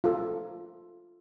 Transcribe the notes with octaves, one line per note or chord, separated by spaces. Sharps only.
F4 A4